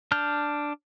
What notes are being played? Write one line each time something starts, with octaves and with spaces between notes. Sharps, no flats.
D4 F6 G6